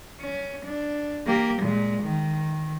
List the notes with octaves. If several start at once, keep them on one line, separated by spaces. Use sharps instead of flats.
C#4
D4
A#3 G4
A#2 G#3
D#3